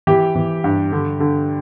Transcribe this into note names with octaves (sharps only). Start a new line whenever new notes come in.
E3 G4
E3
G2
D3
D3